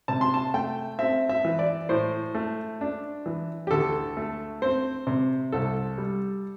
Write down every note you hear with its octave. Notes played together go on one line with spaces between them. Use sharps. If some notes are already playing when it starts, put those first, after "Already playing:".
C3 A5
C6
A5
A3 G5
C4 E5
E5
E3
D5
A2 C5
A3
D4
E3
G4
D2 A4
A3
C4 C5
C3
C2 A4
G3